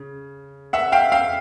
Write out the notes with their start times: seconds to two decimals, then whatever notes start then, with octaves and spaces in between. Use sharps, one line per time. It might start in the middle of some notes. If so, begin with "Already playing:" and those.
Already playing: C#3
0.73 E5 F#5
0.92 F5 G5
1.12 F5 G5